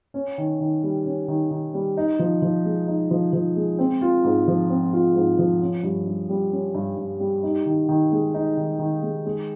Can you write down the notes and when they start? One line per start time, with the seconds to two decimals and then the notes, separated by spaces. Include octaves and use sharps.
0.14 C#4
0.38 D#3
0.60 D#3
0.83 G3
1.06 C#4
1.28 D#3
1.51 D#3
1.74 G3
1.97 D#4
2.19 F3
2.42 F3
2.65 G#3
2.88 D#4
3.11 F3
3.33 F3
3.56 G#3
3.79 C4
4.01 F4
4.24 G#2
4.48 F3
4.70 C4
4.93 F4
5.16 G#2
5.38 F3
5.61 C#4
5.83 G2
6.06 G2
6.29 G3
6.51 C#4
6.74 G2
6.97 G2
7.20 G3
7.43 D#4
7.66 D#3
7.88 D#3
8.12 G#3
8.34 D#4
8.57 D#3
8.79 D#3
9.02 G#3
9.25 G#3